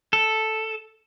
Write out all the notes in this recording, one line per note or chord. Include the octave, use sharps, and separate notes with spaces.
A4